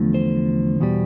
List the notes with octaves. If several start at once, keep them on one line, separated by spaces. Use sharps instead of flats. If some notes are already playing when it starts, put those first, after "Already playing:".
Already playing: E2 D3 F3 A3
C5
E2 B2 G3